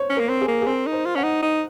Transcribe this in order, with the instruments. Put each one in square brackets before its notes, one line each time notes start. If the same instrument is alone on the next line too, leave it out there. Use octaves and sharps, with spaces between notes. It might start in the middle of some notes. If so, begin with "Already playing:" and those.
Already playing: [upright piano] C5 C#5
[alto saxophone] C#4
[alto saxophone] A#3 [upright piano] A#4
[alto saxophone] C4
[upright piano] G#4
[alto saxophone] A#3
[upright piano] G#4
[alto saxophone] C4 [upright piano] A#4
[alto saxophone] D#4
[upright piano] C5
[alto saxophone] F4
[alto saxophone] C#4 [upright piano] F#5
[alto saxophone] D#4
D#4